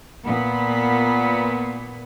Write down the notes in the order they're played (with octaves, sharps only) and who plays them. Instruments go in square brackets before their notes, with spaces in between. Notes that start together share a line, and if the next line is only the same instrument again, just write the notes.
[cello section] A#2 B3